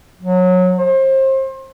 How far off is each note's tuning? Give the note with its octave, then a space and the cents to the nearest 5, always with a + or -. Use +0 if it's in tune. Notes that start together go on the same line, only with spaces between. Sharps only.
F#3 -20
C5 +30